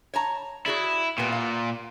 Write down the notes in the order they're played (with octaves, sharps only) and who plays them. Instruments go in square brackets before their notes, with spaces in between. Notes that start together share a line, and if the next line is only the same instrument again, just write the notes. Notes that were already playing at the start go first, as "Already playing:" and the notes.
[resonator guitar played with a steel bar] C#5 A5 A#5
[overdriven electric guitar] E4 [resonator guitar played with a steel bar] F#4 G#4 D5
[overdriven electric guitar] A#2 [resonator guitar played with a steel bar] G3 B3
[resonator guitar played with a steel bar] F5